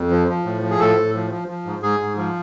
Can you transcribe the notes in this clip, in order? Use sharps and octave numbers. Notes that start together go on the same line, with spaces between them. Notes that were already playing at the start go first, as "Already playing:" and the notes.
Already playing: F2
F3
F3
A2
F3
G#4
A2 A4
A2
F3
F3
F3
G#2
G#2 G#4
G#2
F3